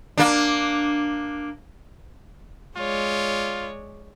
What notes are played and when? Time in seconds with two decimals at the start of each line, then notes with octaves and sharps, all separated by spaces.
0.18 A#3 D4
2.77 G#3 F4 C#5 D5